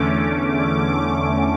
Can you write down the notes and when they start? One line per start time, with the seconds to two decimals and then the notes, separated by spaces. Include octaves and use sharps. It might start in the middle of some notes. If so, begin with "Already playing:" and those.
Already playing: E2 D3 A3 C#4 D6
0.50 D6